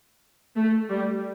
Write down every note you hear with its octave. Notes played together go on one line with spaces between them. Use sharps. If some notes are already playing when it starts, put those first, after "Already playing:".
A3
G3